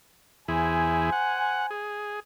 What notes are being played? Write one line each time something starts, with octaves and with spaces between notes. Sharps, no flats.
E2 E4 G#4 C5 G#5
F#5
G#4